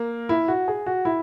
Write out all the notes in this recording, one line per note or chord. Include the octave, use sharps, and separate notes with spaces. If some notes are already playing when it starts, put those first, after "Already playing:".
Already playing: A#3
E4
F#4
G#4
F#4
E4